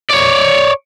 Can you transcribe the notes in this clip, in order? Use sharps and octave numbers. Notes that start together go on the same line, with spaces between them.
C#5 D5